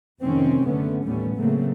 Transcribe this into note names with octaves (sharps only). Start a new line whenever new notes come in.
F1 C3 D#3 A#3 C4 C#4
F#1 D3 A3 B3 C#4
A1 D#2 G3 A3 B3 C#4
C#3 F#3 A3 A#3 C4